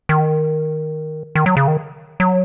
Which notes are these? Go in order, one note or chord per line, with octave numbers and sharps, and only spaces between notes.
D#3
D#3
F#3
C#3
D#3
F#3